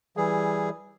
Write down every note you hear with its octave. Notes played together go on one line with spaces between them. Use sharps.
E3 G3 G#4